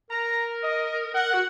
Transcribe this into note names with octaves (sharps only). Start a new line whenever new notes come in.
A#4 A#5
D#5
A#4 F#5
F#4